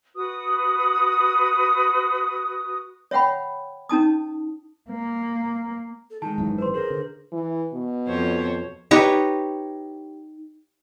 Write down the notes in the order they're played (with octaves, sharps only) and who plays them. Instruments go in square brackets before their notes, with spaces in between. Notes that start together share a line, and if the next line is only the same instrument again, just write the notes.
[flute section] F#4 B4 D#6
[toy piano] C#5 E5 F#5 G5 B5
C#4 D#4 A5 D#6
[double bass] A#3
[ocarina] A4
[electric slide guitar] D#3 G#3 [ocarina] D#4 [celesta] A5
[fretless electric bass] G#1 F#2 E3
[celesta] B4 C6 [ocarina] C5
[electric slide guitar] G#4 C5 [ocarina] A#4
[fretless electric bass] D3
[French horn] E3
B2
[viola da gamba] F2 C5 C#5
[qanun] D#4 G4 B4 C#5